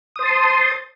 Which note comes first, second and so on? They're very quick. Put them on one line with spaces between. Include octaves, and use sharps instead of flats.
D#6 C5 A5 C6